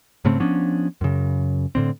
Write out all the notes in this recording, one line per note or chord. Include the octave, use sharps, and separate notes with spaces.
G#2 C#3 A3 C4
F3 B3 C#4 D4
F#2 C#3
A2 D3 C4